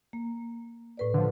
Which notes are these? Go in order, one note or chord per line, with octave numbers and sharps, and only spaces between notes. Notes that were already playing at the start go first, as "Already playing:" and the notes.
A#3
A2 B4 D5
D3 F3